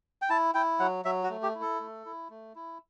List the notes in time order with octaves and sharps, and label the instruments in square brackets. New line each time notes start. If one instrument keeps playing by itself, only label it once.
[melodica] G5
E4 A5
E4 G5
F#3 F#5
F#3 E5
F#4
A3
G4
E4
A4
A3
E4
A3
E4